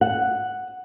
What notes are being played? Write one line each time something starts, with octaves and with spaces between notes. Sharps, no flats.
F#5